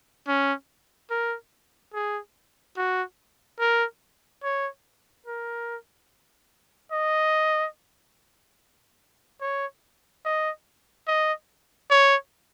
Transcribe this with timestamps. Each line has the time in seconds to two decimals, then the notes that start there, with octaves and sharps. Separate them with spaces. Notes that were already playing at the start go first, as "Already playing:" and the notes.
0.28 C#4
1.10 A#4
1.94 G#4
2.77 F#4
3.59 A#4
4.43 C#5
5.26 A#4
6.92 D#5
9.41 C#5
10.25 D#5
11.08 D#5
11.91 C#5